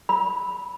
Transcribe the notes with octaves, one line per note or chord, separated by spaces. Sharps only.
B5